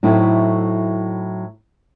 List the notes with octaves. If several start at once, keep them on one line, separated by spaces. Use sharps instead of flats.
A2 F#3 A3 C4 D#4 E4